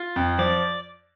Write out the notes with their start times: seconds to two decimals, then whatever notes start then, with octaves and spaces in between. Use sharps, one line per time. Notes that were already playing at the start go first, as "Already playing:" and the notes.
Already playing: F4
0.16 F2
0.38 F3 D5